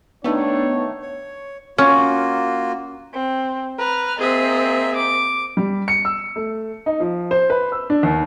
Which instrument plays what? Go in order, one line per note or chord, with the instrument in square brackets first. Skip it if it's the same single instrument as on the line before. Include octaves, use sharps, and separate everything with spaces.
[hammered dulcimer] D#3 A3 [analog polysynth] B3 D#4 [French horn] D4 [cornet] C#5
[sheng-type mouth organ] C#5
[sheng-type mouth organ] A#3 F4 F#4 [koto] C#4
[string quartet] C4
B4 A#5 F6
[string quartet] A#3 C4 D#5 [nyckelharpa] G#4 E5
[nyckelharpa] D6
[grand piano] G3
C#7
E6
A3
D#4
F3
C5
B4
E6
D4
D#2